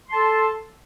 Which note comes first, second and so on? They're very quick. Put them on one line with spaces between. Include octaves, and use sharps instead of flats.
C6 A5 A4